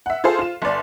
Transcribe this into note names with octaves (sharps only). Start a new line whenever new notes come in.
E5 F#5
F4 G#4 A4 C5 F5 C6
F4 E7
G1 D5